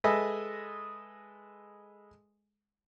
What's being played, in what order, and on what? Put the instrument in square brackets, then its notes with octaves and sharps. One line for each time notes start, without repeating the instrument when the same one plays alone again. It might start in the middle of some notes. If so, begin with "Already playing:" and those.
[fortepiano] G#3 A4 B4 D#5 E5 G#5